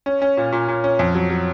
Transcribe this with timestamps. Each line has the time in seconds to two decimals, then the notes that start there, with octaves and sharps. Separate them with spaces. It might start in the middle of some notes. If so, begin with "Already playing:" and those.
0.06 C#4
0.22 C#4
0.37 A#2
0.52 A#2
0.68 A#2
0.84 C#4
0.99 F2
1.15 F#3
1.30 F#3